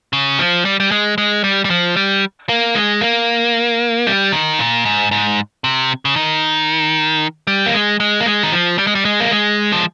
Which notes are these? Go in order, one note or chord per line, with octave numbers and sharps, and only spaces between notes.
C#3
F3
G3
G3
G#3
G#3
G3
G3
F3
G3
A#3
G#3
A#3
G3
D#3
A#2
G#2
G#2
C3
C#3
D#3
G3
A#3
G#3
G#3
A#3
G#3
D#3
F3
G3
G#3
G3
G#3
A#3
G#3
F3